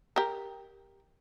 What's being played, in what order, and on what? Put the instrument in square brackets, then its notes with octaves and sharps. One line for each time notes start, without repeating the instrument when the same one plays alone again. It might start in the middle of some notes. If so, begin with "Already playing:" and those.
[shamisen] G4 A#4